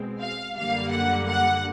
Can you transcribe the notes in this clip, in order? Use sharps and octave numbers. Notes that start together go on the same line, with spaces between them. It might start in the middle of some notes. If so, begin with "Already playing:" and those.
Already playing: B2 G#3 C4
F5
F#2 D3 G3 A#3 F5
F#5
F#5